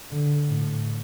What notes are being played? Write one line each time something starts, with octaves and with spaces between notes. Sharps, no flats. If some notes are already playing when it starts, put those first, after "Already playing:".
D3
A2